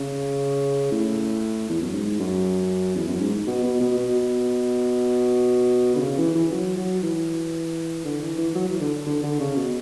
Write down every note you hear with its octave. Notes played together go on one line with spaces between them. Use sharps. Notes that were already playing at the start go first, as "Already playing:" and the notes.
Already playing: C#3
A2
E2
F#2
G#2
F#2
E2
F#2
G#2
B2
B2
B2
B2
D3
C#3
E3
E3
F#3
F#3
E3
D3
E3
E3
F#3
E3
D3
D3
D3
C#3
B2